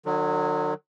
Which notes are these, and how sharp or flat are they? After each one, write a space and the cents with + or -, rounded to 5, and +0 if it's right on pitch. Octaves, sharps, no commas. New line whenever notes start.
D3 +45 F#3 -15